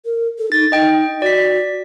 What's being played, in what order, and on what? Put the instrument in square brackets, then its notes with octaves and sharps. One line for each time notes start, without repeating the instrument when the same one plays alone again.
[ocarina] A#4
A4
[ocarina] D#4 [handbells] A6
[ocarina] D#4 [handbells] D#5 G5
[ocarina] F#4 [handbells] D5 B6